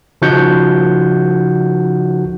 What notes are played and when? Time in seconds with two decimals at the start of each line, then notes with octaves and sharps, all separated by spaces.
0.22 C#3 F3 D#4 F#4 F#5 G6